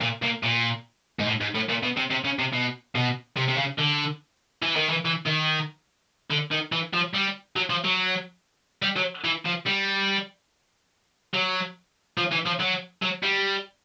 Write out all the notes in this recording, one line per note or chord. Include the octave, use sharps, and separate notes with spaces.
A#2
A#2
A#2
G#2
A2
G#2
A2
A#2
B2
C3
C3
C#3
C3
B2
B2
C3
C3
C#3
D3
E3
D#3
E3
E3
D#3
D3
D#3
E3
F3
G3
F#3
F3
F#3
G3
F#3
E3
F3
G3
F#3
F3
E3
F3
F#3
F#3
G3